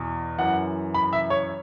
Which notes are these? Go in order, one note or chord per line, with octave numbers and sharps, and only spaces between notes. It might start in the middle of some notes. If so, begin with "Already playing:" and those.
Already playing: E2 B2
F#2 E3 F#5
B5
E5
C#5